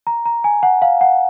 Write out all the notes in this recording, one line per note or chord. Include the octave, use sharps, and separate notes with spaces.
A#5
A#5
G#5
F#5
F5
F#5